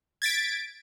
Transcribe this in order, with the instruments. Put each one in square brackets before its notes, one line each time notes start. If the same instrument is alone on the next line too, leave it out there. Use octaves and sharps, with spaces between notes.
[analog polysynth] G#6 A6 B6 D7